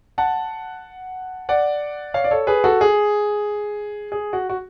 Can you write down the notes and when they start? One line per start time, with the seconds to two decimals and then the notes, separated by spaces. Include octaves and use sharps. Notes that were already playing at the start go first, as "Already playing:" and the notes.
0.18 F#5 A5
1.49 D5 F#5
2.14 C#5 F5
2.24 D5
2.31 A4 C#5
2.47 G#4 B4
2.64 F#4 A4
2.81 G#4
4.12 G#4
4.33 F#4
4.49 F#4